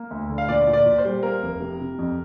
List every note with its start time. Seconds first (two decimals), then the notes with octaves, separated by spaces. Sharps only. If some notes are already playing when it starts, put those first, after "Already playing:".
Already playing: A#3
0.11 D2
0.30 D3
0.38 F5
0.48 A#2 D5
0.67 A#2
0.73 D5
0.86 A#2
0.98 C5
1.05 G3
1.23 A#3 A#4
1.42 F1
1.60 C3
1.80 C3
1.99 F2